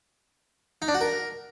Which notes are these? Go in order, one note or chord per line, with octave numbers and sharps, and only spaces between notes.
D#4
D4
F#4
A#4